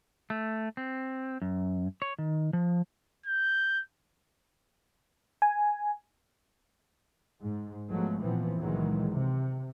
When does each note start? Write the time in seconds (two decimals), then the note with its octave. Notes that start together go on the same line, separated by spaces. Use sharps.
0.30 A3
0.77 C4
1.42 F#2
2.02 C#5
2.18 D#3
2.53 F3
3.26 G6
5.42 G#5
7.42 G#2
7.90 F3 F#3 G#3 A3 B3
8.21 A#2 E3 F3 B3 C4
8.59 C#2 A#2 D#3 E3 F#3 G#3
9.09 C3